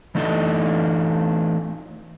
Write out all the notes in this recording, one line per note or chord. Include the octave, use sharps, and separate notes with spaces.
E3 A3 D4 D#4 A4 D#5